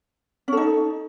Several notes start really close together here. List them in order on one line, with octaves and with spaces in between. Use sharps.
C#4 A4 D#4